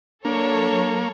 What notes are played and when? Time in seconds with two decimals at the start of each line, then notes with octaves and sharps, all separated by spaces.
0.25 F#3 A#3 D4 A4 C#5